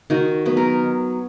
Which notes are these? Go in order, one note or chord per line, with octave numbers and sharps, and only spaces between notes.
D#3 F#4
F#3 B3
A#4